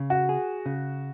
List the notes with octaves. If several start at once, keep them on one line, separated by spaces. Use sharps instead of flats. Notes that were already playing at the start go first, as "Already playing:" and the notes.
Already playing: C#3
F#4
G#4
C#3